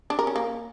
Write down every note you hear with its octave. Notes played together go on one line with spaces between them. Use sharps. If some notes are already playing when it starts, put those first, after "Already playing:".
D4
A#4
C#4
A#3